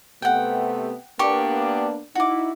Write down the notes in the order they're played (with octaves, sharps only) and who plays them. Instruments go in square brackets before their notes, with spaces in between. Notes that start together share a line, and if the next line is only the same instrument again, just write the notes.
[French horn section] C3 A3 B3 [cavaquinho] F#5 G5
[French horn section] A#3 B3 D4 [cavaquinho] G4 C#6
[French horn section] D#4 E4 [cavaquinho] F#4 D6